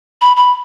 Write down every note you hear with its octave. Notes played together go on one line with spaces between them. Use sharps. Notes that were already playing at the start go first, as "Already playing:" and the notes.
B5
B5